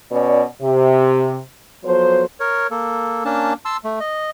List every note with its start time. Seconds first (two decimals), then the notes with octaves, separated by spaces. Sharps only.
0.12 B2 C#4 B4 D5
0.62 C3
1.85 F3 F#3 B3 A4 C5
2.40 A#4 C#5
2.71 A#3 A4
3.25 A#3 C#4 D4 A5
3.65 A5 C6 E6
3.84 A3
4.00 D#5